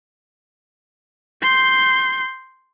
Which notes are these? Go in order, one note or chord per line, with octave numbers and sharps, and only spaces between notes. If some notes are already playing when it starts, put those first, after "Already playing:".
C6 G6